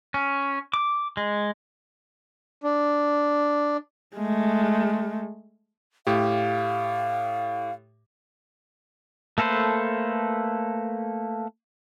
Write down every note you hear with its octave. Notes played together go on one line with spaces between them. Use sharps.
C#4
D6
G#3
D4
G#3 A3
A2 G4 F5
A3 A#3 A4 B4 C5